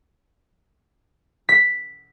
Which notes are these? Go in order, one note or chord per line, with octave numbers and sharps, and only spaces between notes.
B6